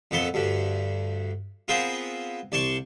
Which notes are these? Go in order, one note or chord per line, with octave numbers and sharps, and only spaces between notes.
F2 A#2 B3 A4 C6
D2 G2 D3
B3 C4 F4 G#4 A#4 C5
C2 D5 A5 C6 C#6